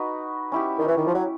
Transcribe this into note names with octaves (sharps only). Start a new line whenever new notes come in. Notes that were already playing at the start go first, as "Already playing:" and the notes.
Already playing: D#4 F#4 B4
C#4 E4 G4
D#3
E3
D#3
F3
F#3